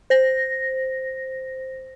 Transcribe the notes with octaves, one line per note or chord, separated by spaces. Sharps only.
C5 A#6